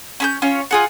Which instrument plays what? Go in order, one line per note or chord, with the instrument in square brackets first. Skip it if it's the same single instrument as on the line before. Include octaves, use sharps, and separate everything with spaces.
[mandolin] C#4 B5 G6
C#4 F4 C#5
F4 G#4 F#5